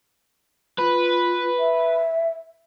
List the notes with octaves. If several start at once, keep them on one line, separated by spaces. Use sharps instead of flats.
F4 B4
E5